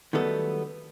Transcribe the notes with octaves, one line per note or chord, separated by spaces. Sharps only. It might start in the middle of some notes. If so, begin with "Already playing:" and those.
D#3 F#3 G3 A3 B3 A4